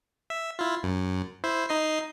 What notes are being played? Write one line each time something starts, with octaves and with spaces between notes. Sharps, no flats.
E5
E4 F4
F#2
E4 C5
D#4 D#5 C7